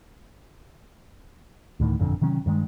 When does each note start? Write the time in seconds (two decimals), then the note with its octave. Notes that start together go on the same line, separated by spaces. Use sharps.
1.80 D2 A2 D#3
1.99 G1 F2 A#2 D3
2.21 C3 D#3 F#3 C#4
2.46 G2 D#3 G#3